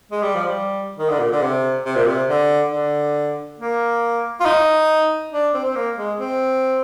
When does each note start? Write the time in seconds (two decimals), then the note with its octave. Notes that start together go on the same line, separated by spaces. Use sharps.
0.12 G#3
0.23 G3
0.35 F3
0.47 G3
0.99 D#3
1.09 D3
1.20 A#2
1.32 D3
1.42 C3
1.86 C3
1.96 A#2
2.07 C3
2.29 D3
2.72 D3
3.59 A#3
4.41 F4
4.46 D#4
5.33 D4
5.54 C4
5.65 C4
5.76 A#3
5.98 G#3
6.20 C4